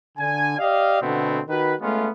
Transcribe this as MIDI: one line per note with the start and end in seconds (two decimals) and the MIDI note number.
0.18 0.59 50
0.18 0.59 80
0.59 0.98 67
0.59 0.98 74
0.59 0.98 75
0.59 0.98 77
1.01 1.40 47
1.01 1.40 50
1.01 1.40 57
1.01 1.40 59
1.01 1.40 60
1.49 1.73 51
1.49 1.73 66
1.49 1.73 71
1.81 2.08 56
1.81 2.08 57
1.81 2.08 59
1.81 2.08 61
1.81 2.08 65